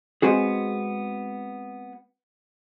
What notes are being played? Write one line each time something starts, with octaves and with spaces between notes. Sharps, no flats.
G#3 B3 C4 F#4 G#4